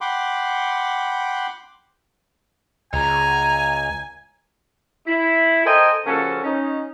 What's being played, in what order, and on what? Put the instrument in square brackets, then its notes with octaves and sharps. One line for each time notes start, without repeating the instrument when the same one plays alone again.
[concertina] F#5 G5 B5 C6 D6
[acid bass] C#2 [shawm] G#5 [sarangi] A#5
[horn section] E4
A4 A#4 C5 D#5 G5 G#5
C#3 F3 A#3 C#4 F#4 A4
C#4 D#4